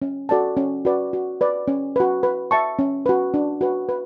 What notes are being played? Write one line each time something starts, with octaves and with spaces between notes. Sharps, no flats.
C#4
F#4 A4 D5 A5
C#4
F#4 B4 D5
F#4
B4 D5
C#4
F#4 B4
B4
E5 A5 C#6
C#4
F#4 B4
D4
F#4 B4
B4